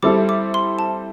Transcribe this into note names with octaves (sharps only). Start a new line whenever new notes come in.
G3 C4 E4 A4 D6
D6
C6
A5